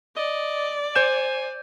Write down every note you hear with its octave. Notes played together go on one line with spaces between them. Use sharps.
D5 D#5
C5 G#5 G6 E7